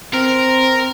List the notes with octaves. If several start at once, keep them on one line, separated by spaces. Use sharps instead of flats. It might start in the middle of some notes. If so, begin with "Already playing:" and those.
C4 A#4